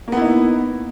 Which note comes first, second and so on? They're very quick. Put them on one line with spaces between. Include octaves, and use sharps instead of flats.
A#3 B3 E4 D#4